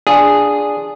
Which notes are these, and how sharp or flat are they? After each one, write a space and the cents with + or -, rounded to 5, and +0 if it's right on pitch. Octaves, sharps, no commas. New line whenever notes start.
D4 +0 F4 +5 G#4 -5